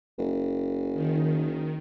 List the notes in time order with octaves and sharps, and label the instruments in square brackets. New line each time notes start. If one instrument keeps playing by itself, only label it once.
[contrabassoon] F#1
[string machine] D#3